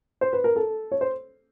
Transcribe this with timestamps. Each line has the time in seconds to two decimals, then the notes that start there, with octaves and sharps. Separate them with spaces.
0.21 C5
0.33 B4
0.44 A#4
0.56 A4
0.92 C#5
1.01 C5